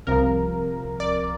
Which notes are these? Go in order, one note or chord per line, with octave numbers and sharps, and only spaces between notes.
C2 C3 F3 A#4
D5